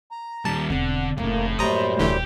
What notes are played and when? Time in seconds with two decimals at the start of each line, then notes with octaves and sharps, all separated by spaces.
0.11 A#5
0.45 D#2 G3 A5
0.70 E1 D3 C4 F#5
1.18 F1 A2 C#3 A#3
1.59 F#2 G3 A3 A#3 C5 A#5 D#6
1.99 D#1 D3 E3 A3 G4